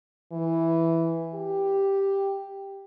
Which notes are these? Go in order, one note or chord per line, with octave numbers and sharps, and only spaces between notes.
E3
G4